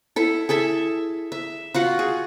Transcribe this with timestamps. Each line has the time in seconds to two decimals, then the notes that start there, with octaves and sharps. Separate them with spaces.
0.16 E4 A4
0.49 G#4 A4 E5 A5
1.32 E5
1.74 F4 F#4 F#5
1.99 G#4